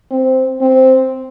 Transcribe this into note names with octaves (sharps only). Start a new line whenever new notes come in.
C4
C4